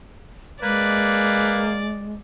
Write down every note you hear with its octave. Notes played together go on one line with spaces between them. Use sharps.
G#3 A#3 B4 D5